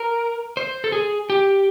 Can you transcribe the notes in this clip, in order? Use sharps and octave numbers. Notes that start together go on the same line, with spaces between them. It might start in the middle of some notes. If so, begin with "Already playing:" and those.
Already playing: A#4
C5
A4
G#4
G4